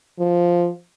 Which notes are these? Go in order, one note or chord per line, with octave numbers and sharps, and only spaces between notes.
F3